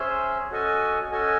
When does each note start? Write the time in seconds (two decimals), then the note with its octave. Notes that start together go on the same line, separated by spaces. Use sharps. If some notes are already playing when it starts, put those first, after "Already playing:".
Already playing: C#4 G#4 C5 E5
0.51 C#4 F#4 A4 D#5 G#5
1.11 C#4 F#4 A4 D#5 G#5